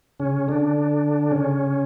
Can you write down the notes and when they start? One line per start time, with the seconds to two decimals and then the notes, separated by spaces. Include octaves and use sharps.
0.20 C#3 C#4
0.48 D3 D4
1.32 C#3 C#4